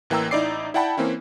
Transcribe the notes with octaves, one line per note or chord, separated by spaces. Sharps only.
A1 E3 A#3 G5 A#5 E6
A1 D#4 E4 D5 D6 C7
E4 D5 F#5 G5 A5 B5
E3 A#3 C4 C#4 E4